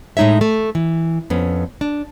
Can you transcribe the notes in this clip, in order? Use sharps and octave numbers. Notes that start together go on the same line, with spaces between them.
A2 G#3 D#4 C#5 E5
A3
E3
F2 B3 C#4
D4